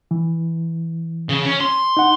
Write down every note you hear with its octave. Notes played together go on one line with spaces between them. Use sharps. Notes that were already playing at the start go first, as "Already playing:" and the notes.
E3
C#3
C#4
C6
D#4 F#5